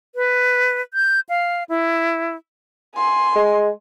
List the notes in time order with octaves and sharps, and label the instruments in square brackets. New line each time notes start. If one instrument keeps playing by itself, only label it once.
[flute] B4
G6
F5
E4
[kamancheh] G#5 C6
[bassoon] G#3